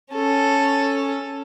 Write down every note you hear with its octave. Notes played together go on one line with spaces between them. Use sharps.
C#4 A4